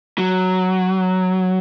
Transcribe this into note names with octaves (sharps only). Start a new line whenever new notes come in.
F#3